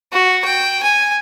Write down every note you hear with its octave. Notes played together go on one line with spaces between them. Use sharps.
F#4
G5
G#5